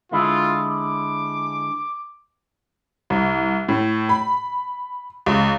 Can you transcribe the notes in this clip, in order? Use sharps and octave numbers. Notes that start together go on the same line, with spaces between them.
D3 G#3 E4 F4
D6
C2
A2
B5
C#2